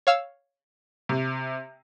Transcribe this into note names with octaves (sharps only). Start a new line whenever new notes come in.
C#5 F5 E6
C3